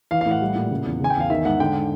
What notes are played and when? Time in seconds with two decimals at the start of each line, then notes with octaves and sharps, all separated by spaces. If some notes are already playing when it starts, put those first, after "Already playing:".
0.11 E3 F5
0.21 A2 F5
0.31 F#5
0.42 G3
0.55 A#2
0.71 C#3
0.85 E2
1.01 C#3 G#5
1.10 G5
1.16 E2 F5
1.30 D#3 E5
1.45 G#2 F#5
1.60 D3 G5